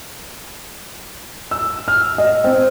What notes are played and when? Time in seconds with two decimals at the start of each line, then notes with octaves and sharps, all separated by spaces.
1.51 E6
1.88 F6
2.18 D#5
2.44 C4